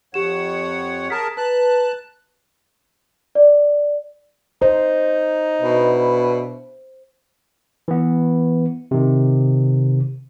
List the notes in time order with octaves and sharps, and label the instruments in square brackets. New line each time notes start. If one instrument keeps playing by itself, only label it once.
[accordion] F2 C#5 F#5 [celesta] G4 E7
[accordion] G#4 A#4 A5 [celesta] A#5 B6
[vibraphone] B4 [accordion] A5 F#6
[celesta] D5
[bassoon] D#4 [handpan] C5
[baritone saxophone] B2 [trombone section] B3 D4 E4
[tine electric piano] E3 B3
C3 D#3